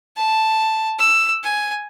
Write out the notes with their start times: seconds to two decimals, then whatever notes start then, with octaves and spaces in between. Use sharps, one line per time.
0.16 A5
0.99 E6
1.43 G#5